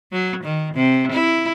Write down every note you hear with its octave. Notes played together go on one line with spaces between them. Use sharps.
F#3
D#3
C3
E4